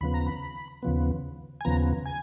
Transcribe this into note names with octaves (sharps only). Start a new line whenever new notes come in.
D#2 C#3 F3 B3 B5
A#5
B5
D#2 C#3 F3 B3
G#5
D#2 C#3 F3 B3 A#5
G#5